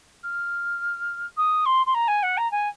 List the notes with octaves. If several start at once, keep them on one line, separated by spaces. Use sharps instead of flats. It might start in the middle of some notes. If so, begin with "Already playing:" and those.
F6
D#6
C6
C6
A#5
G#5
F#5
A#5
G#5